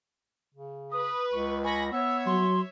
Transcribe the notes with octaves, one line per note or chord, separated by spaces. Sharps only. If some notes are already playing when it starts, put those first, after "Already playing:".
C#3
B4 D#6
C#2 C#6
G#5 B5 C#6 A#6
B3 C#5 E5 E6
F#3 C6